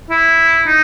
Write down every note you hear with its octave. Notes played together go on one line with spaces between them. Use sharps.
E4
D#4